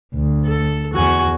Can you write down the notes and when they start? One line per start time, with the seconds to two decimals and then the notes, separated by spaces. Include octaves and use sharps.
0.14 D2
0.46 A4
0.93 E2 F#4 G#5